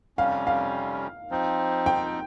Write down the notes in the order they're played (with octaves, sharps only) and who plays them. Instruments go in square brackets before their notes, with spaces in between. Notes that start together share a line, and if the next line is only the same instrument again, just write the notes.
[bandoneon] F2 C3 G3 C#4 [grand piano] F5
[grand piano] F5
[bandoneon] F3 C4 D#4
[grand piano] G5